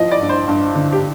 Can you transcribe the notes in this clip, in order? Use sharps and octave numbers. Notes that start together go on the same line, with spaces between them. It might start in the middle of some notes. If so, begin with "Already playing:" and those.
Already playing: F3 D#5
D5
G2
C5
G2
D3
G4